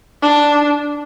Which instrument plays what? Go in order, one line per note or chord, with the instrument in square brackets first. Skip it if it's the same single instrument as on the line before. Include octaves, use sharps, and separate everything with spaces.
[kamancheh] D4